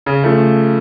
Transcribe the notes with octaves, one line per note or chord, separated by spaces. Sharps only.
C#3
F3 A3